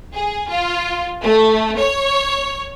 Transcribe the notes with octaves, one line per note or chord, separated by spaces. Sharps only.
G#4
F4
A3
C#5